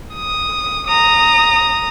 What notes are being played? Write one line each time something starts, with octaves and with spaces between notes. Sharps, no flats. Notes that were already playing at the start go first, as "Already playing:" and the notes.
D#6
A#5 D#6